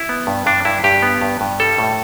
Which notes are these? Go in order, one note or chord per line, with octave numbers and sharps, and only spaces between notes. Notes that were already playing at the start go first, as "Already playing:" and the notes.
Already playing: E4
B3
G2
G2 D4
G2 E4
G2 G4
B3
G2
G2
G3 A4
A2